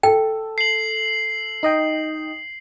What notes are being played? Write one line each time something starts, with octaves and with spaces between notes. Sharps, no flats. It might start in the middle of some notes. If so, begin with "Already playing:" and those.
A4 G5
C7 F#7
D#4 D#5 G5